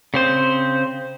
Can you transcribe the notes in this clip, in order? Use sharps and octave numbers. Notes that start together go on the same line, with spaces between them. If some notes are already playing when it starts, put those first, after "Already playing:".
C#3 C4 C5